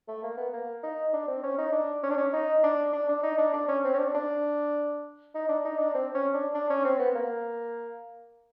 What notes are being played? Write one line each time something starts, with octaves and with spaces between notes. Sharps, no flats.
A3
A#3
B3
A#3
D#4
D4
C4
C#4
D#4
D4
C#4
D4
C#4
D#4
D4
D4
D4
D#4
D4
D4
C#4
C4
C#4
D4
D4
D#4
D4
D#4
D4
C4
C#4
D4
D4
C#4
C4
B3
A#3